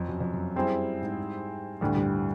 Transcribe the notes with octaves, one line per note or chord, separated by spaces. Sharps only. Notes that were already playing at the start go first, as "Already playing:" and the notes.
Already playing: F2 F#3
F#2
F2
F#2
G3 C4 E4 G#4 C5
G#2
D2 A2 D3 G3
G2